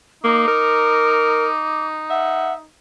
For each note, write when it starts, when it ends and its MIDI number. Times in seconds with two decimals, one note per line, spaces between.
0.24 0.43 58
0.24 2.66 63
0.24 1.87 86
0.48 1.48 70
2.10 2.55 76
2.10 2.53 78